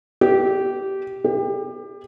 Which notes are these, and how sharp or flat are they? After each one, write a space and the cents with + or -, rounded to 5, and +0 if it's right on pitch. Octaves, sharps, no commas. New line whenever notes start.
G4 -15
G4 +25